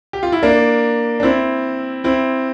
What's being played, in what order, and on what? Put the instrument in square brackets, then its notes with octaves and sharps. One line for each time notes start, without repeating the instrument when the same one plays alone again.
[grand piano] G4
F4
E4
A#3 D4
D4
C4 E4
C4 E4